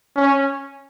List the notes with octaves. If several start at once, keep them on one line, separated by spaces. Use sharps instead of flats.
C#4